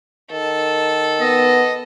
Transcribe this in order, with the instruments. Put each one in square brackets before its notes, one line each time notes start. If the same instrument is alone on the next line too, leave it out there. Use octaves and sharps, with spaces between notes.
[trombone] D#3 [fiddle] A4
[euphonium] B3 [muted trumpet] D#5